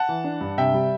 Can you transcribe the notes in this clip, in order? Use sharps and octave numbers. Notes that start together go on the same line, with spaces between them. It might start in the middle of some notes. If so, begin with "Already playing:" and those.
Already playing: F#5 A5
E3
D4
G2
C3 E5 G5
G3